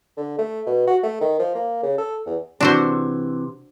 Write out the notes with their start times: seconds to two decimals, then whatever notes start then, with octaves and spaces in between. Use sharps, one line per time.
0.17 D3
0.39 A3
0.67 B2
0.87 F#4
1.03 A3
1.21 D#3
1.39 F3
1.55 A#3
1.83 C#3
1.98 A4
2.27 E2
2.61 C3 E3 D4 F#4 C5